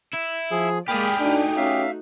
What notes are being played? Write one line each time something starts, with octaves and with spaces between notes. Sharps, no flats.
E4
F3 G#4
G#3 A#3 G4 G#4 D5 G5 B5 F6
A3 D4 D#4 F#4
C#4 E5 F5